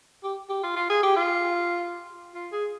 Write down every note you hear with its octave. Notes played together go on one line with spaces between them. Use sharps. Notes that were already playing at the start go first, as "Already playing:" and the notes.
G4
G4
F4
F4
G#4
G4
F4
F4
G#4